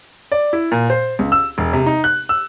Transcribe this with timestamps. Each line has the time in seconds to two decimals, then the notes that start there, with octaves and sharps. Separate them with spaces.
0.32 D5
0.53 E4
0.71 A#2
0.90 C5
1.19 C#2
1.32 E6
1.58 E1
1.73 C3
1.87 D#4
2.04 F#6
2.29 E6